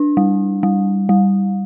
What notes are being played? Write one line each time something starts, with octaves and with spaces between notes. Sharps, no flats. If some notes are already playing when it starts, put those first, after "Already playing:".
Already playing: D4
G3
G3
G3